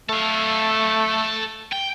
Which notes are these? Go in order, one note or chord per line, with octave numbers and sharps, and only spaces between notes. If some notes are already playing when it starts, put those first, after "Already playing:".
A3 A4 F5
G5